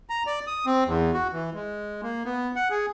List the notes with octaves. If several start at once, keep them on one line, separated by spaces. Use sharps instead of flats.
A#5
D5
D#6
C4
E2
F#4
E3
G#3
A#3
B3
F#5
G#4